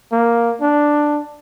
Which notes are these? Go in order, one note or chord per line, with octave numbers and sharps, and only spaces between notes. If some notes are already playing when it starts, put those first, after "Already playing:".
A#3
D4